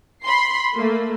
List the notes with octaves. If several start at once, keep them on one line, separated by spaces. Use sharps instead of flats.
B5 C6 C7
A3 A#3